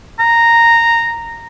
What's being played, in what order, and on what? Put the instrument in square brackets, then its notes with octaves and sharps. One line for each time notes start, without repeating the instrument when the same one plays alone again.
[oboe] A#5